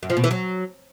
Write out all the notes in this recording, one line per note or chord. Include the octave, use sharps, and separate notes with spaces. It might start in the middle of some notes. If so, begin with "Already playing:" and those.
F#2
F3
B2
E3
F#3